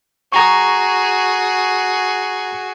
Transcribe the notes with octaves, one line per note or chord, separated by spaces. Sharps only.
F#4 G#4 A#5 C#6